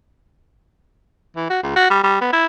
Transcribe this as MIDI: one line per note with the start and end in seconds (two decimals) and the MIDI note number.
1.36 1.48 52
1.50 1.59 66
1.63 1.71 37
1.76 1.88 66
1.90 2.01 55
2.03 2.18 55
2.21 2.30 59
2.33 2.46 64